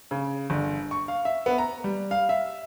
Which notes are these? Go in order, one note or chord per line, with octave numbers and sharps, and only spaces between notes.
C#3
G1
C#6
F5
E5
B3
A#5
G3
F5
E5